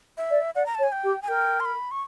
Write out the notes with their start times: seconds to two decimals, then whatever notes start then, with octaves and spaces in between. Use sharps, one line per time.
0.18 E5
0.30 D5
0.55 D5 F#5
0.66 A#5
0.75 A5
0.79 C#5
0.83 G#5
0.92 G5
1.03 G4
1.22 G#5
1.28 A#4 G5
1.60 C6
1.65 B5
1.91 C#6